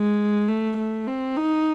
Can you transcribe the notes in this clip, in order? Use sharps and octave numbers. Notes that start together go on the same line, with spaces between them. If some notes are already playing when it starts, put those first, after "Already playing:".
Already playing: G#3
A3
A3
C4
D#4